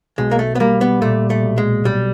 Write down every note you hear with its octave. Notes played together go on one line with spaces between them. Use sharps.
B1 G#3
A#3
A3
B3
G3 A#3
B3
A#2 A3
A3
B1
G#3
B1 G3